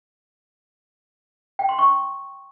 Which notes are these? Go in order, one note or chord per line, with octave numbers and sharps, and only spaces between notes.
G5
C6
C#6